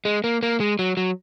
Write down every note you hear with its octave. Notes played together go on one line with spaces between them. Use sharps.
G#3
A#3
A#3
G#3
F#3
F#3